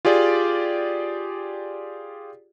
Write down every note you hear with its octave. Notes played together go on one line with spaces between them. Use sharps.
F4 G4 G#4 D5